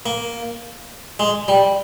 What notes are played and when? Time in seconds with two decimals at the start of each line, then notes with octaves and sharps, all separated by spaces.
0.06 A#3
1.19 G#3
1.48 G3